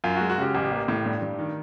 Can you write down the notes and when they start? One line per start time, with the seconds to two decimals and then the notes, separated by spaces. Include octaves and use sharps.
0.04 F#2 F4
0.16 F#4
0.21 G#3
0.30 F#4
0.38 C#3 G4
0.54 A1 G4
0.71 A#3
0.88 A2
1.05 G2
1.22 G2
1.39 D#3